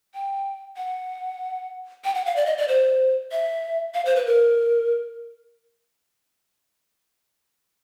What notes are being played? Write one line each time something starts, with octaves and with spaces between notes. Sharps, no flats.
G5
F#5
G5
F#5
F5
D5
D#5
D5
C5
E5
F5
C5
B4
A#4